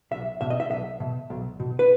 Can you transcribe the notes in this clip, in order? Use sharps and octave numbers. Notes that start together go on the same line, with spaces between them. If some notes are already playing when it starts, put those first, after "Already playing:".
B1 E5
B2 E5
D#5
E5
B1 E5
B2
B1
B2
B4